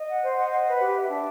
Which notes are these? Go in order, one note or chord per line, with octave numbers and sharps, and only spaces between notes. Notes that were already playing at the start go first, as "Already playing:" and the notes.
Already playing: D#5
F#5
C5
D#5
F#5
B4
G4
E5
D4